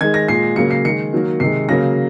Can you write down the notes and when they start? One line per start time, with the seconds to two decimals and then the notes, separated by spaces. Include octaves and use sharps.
0.01 D#3 G#3 G#6
0.14 A#6
0.28 A#2 G#3 C7
0.56 C#3 F#3 A#3 C#7
0.71 C7
0.84 D#3 G#3 C#7
1.13 D#3 F#3 A#3
1.40 C3 D#3 G#3 C7
1.69 C#3 F#3 A#3 A#6